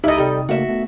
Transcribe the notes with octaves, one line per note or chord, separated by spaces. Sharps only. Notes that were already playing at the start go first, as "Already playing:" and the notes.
C#2 D#4 E4 G4 A4 D#5
C3 G3 A4 D#6
C#3 A3 A#3 F#4 E5
A3 B3